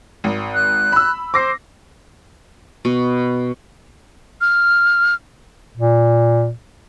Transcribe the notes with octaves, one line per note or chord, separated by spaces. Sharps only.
G#1
F#6
B5 E6
C5 D6 A#6 C7
B2
F6
A#2